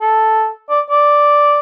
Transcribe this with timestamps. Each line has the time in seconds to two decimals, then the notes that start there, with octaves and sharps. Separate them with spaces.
0.01 A4
0.70 D5
0.90 D5